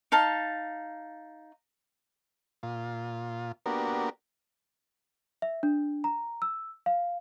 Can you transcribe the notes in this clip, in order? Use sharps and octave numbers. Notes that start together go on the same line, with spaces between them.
D#4 F5 A5
A#2 F4
A#3 B3 D4 F#4 G4 A#4
E5
D4
A#5
E6
F5